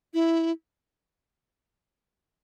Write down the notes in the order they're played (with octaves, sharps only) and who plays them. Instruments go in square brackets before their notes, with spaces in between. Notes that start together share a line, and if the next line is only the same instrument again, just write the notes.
[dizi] E4